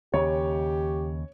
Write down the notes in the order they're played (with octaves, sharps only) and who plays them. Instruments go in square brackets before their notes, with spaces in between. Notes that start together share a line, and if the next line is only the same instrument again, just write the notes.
[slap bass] D#2 C#3 [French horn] G4 [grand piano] C#5